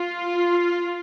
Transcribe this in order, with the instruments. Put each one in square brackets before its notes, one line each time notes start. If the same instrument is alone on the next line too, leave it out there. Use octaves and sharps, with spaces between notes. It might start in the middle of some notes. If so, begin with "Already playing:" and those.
Already playing: [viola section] F4